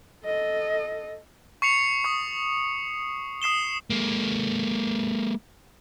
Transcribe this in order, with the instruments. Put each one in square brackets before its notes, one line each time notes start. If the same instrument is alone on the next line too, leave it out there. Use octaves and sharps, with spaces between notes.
[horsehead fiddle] A4 D#5
[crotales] C#6 C7 C#7 F7
C#6 D#6
D#6 C7 E7 G7
[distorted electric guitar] G#3 A#3